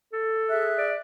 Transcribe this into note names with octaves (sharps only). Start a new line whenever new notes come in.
A4
G#4 E5 F#6
D5